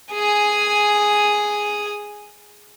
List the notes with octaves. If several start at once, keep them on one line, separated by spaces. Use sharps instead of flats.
G#4 G#5